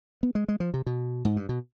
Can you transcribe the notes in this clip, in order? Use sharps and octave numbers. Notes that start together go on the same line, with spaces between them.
B3
G#3
G#3
F3
C3
B2
G#2
G2
B2